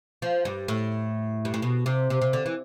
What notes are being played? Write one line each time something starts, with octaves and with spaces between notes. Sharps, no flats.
F3
G2
A2
G2
A2
B2
C3
C3
C3
D3
E3